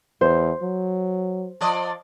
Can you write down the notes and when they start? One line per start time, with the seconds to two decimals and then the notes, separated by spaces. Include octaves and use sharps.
0.21 E2 C5
0.62 F#3
1.61 F3 D5 D#5